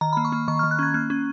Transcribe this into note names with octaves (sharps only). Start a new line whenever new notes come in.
D#3 A#5
A#3 B5
C#6
A#3
D#3 C#6
D#3 F6
F#6
C#4 G#6
A#3 F#6
C#4